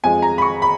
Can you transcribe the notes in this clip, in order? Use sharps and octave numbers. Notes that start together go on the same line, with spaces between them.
F2 F3 G#3 G#5
A#5
B5
C#6
B5